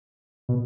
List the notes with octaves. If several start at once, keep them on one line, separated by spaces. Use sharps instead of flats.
B2